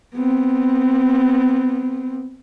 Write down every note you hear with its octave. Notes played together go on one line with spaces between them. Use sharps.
B3 C4